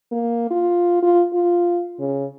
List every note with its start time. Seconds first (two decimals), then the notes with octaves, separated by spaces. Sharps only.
0.12 A#3
0.50 F4
1.02 F4
1.33 F4
1.99 C#3